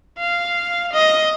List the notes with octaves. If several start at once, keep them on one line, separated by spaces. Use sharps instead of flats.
F5
D#5